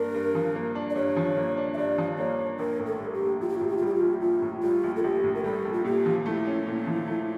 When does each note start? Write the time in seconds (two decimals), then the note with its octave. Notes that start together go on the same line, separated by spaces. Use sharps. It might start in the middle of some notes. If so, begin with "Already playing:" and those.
Already playing: G2 A#3 D4 A#4
0.14 G2
0.35 F3
0.55 A#3
0.75 D4
0.90 D5
0.96 G2 C#5
1.16 F3
1.37 A#3
1.57 D4
1.74 E5
1.77 G2 D5
1.98 F3
2.18 A#3 C#5
2.39 D4
2.59 A#1 A#4
2.80 A2
2.86 A4
3.00 G3
3.14 G4
3.21 A#1
3.40 A#1 F4
3.49 G4
3.58 A2 F4
3.68 G4
3.77 F4
3.82 G3 G4
3.95 F4
4.02 A#1
4.21 A#1 F4
4.42 A2
4.63 G3 F4
4.83 A#1
4.96 A4
5.04 A#1 G4
5.24 A2
5.35 A#4
5.44 G3 A4
5.65 A#1
5.73 F4
5.85 A#2 G4
6.06 F3
6.26 A3 E4
6.47 C#4
6.67 A#2
6.87 F3
7.07 A3